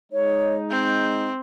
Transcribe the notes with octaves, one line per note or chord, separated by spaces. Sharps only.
G#3 D#4 C#5
C4 G6